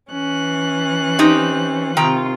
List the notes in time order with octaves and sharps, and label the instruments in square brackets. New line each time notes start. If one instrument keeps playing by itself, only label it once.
[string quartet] E3 C#4 F#6
[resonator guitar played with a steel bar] C4 D#4 G4
[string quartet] C3 F4 [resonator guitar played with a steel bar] D#3 G5 A#5